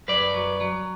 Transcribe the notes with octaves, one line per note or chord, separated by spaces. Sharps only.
F#2 B4 D5
F#3
F#3